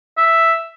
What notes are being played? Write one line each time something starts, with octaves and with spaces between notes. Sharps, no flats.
E5